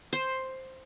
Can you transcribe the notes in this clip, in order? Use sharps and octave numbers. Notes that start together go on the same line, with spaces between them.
C5